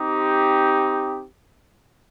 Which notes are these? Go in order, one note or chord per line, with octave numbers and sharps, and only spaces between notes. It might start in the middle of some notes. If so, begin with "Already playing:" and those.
Already playing: C4 D#4 G4